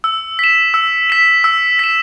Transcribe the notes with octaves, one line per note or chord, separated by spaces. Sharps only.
E6
B6 E7
E6
B6 E7
E6
B6 E7